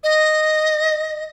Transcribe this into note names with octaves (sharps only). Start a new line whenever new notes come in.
D#5